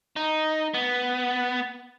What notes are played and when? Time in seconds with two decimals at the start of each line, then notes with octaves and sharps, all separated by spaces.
0.16 D#4
0.74 B3